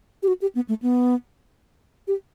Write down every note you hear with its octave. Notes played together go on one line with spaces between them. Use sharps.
G4
F#4
G4
B3
A3
B3
G4